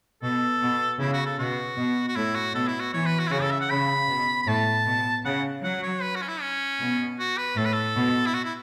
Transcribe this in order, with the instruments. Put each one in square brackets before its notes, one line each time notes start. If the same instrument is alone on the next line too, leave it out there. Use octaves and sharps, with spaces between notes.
[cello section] B2 [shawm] A4
[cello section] B2
[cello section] C#3 [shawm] E4
[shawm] F#4
A4
[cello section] B2 [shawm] F#4
[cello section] B2
[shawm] F#4
[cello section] A2 [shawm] E4
[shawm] F#4
[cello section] B2 [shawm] A4
[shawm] E4
F#4
[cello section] E3 [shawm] C#5
[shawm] B4
F#4
E4
[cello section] C#3 [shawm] F#4
[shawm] A4
E5
F#5
[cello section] C#3 [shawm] B5
[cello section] B2
[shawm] B5
[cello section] A2 [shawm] A5
[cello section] B2
[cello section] C#3 [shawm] F#5
[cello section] F#3 [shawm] F#5
[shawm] C#5
B4
F#4
C#4
E4
C#4
[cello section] B2
[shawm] F#4
B4
[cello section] A2 [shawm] A4
[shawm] B4
A4
[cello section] B2
[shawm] E4
F#4
E4